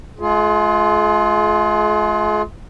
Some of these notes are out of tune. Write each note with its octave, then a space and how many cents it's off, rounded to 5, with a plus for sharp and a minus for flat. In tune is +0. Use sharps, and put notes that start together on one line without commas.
G#3 +45 F4 +0 G#4 +35